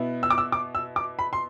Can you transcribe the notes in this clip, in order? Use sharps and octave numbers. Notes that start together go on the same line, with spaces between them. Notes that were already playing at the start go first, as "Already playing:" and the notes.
Already playing: B2 B3 E4
E6
D6
E6
D6
E6
D6
B5
C6